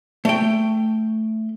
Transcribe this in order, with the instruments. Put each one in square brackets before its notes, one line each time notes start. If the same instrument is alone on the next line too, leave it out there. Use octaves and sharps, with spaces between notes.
[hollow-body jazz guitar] A3 G5